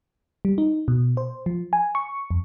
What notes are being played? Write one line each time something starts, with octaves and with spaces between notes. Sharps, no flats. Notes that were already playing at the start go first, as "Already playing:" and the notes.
G3
D#4
B2
C5
F3
G#5
C#6
F2